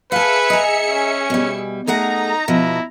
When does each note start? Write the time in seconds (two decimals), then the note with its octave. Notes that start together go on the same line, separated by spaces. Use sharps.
0.12 G#4 B4 E5 F5 A5 C#7
0.50 D#5 A#5
0.89 C#4
1.30 B2 G3
1.87 A3 D#4 G#4 F#5 A#5
2.48 B2 F3 E4